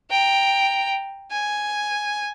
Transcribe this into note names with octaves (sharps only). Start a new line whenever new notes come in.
G5 A#5
G#5